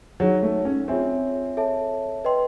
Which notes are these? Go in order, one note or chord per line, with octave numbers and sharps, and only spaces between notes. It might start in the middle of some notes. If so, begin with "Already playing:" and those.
F#3 D#4 G#4 C#5
A3
C#4
C4 F4 G#4 C#5 E5 G#5
A4 C#5 E5 A5
B4 D#5 G5 C6